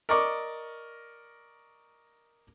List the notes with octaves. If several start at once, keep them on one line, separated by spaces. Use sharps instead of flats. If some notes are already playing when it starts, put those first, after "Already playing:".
A#4 D5 D#5 C#6 D6